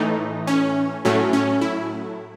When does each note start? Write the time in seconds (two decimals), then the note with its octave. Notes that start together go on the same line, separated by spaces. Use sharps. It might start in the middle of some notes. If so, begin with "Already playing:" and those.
Already playing: A2 E3 A3 D#4
0.47 C#4
1.05 A2 F#3 A3 C#4
1.33 C#4
1.61 E4